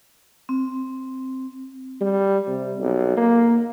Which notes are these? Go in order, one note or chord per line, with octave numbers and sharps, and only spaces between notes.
C4
G3
C3
B1
A#3